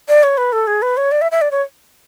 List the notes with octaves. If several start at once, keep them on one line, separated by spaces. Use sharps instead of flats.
D5
C#5
B4
A4
G#4
B4
C#5
D5
E5
E5
D5
C#5